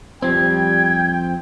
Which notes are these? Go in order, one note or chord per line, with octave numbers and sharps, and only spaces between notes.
F2 F3 G3 C4 G5 G#6